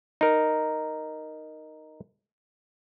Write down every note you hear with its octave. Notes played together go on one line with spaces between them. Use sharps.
D#4 A#4